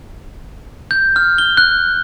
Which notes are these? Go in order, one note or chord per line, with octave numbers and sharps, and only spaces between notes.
G6
F6
G7
F#6